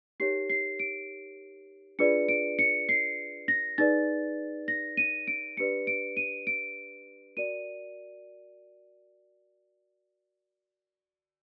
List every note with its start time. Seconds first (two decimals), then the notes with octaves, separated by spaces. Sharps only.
0.20 D#4 G4 A#4 C#5 C7
0.50 C7
0.79 D7
1.99 D4 F4 G#4 B4 D5 C#7
2.29 D7
2.59 C#7
2.89 C7
3.48 A#6
3.78 D#4 G#4 B4 D5 A6
4.68 A#6
4.97 D#7
5.28 D7
5.57 D4 G4 B4 D5 C#7
5.87 D7
6.17 D#7
6.47 D7
7.37 F#4 A#4 D5 D#7